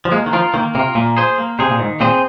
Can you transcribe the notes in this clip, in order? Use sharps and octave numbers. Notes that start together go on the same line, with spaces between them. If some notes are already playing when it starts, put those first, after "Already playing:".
F3
G#3 A#3
D#3
F3 F4 A#4
D#3 A#3
C3 F4 A#4
A#2 A#3
G#4 C5
A#3
C3 G#4 C5
A#2
G#2 D#3
A#2 C4 G#4 C5